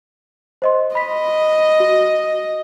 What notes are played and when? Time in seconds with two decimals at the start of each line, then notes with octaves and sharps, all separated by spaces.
0.62 C5 D#5 C6
0.95 D#5 B5 B6
1.80 F#4